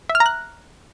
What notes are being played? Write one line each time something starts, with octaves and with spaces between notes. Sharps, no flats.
E5
F6
A#5
F#6